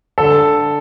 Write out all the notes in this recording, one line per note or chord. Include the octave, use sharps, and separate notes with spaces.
D3 A4